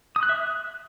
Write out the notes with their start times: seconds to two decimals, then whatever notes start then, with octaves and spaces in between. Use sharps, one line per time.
0.16 D#6
0.23 F#6
0.29 E5
0.36 F#6